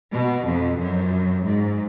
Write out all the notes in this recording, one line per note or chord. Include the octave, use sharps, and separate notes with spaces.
B2
F2
F#2
G#2